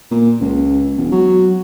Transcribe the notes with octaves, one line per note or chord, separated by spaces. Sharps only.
A#2
C#2
E1
F#3